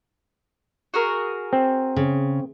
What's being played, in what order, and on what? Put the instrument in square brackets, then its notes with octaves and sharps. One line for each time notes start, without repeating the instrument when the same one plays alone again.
[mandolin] F#4 G#4 A#4
[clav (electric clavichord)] C4
[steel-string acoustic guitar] C#3